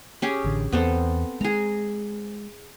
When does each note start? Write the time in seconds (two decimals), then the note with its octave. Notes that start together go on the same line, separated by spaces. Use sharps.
0.22 C#4 G4 G#4
0.44 A1 D3
0.72 E2 B3 C4 A4
1.41 G#3 G#4 A#5